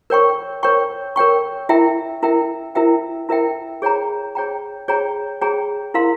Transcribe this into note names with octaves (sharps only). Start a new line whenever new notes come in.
A#4 C#5 G5 C#6
A#4 C#5 G5 C#6
A#4 C#5 G5 C#6
E4 A#4 E5 G5
E4 A#4 E5 G5
E4 A#4 E5 G5
E4 A#4 E5 G5
G#4 C#5 G5 A#5
G#4 C#5 G5 A#5
G#4 C#5 G5 A#5
G#4 C#5 G5 A#5
E4 A#4 F5 C6